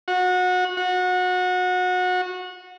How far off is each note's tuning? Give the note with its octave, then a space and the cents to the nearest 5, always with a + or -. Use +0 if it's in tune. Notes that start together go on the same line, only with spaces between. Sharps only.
F#4 -25
F#4 -25